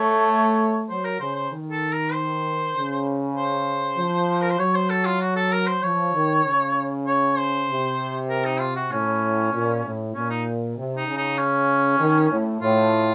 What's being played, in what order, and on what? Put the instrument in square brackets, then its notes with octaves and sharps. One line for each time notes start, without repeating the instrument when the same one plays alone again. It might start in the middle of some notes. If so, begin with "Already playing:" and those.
Already playing: [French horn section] A3 [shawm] C#5
[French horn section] F#3 [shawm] C5
[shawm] A#4
[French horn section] C#3 [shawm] C5
[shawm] C5
[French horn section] D#3
[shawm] A4
A#4
C5
[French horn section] C#3
[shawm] C5
[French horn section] F3
[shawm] A#4
C5
[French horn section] F#3 [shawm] C#5
[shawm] C5
A4
F4
F#4
A4
A#4
C5
[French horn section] F3 [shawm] C#5
[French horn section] D#3
C#3
[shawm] C#5
C5
[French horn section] C3
[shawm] A#4
D#4
F4
F#4
[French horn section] A2 [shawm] C#4
[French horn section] A#2
A2
[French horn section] A#2 [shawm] C#4
[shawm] D#4
[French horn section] C3
[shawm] D#4
[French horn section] C#3
[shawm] D#4
C#4
[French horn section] D#3
A2
[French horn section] A2 [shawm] F4